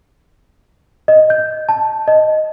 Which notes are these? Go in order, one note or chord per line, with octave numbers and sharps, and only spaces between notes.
D#5
G6
A5
D#5